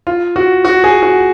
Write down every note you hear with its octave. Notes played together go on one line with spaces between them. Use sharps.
F4
F#4
F#4
G#4
F#4